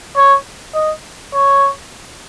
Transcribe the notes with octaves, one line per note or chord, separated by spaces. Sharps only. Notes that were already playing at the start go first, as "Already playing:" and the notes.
C#5
D#5
C#5